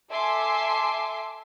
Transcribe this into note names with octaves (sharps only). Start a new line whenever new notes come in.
A4 E5 G#5 C6 D6 C7